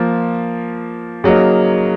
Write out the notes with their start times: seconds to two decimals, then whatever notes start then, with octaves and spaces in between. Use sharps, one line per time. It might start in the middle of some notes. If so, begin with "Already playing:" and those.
Already playing: F3 A#3 F4
1.24 C#3 F#3 A#3 D#4